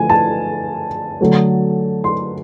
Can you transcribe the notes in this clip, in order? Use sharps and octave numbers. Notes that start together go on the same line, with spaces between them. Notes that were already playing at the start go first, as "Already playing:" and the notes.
Already playing: D3 F3 A3 G#5
A5
D3 F#3 A3
C6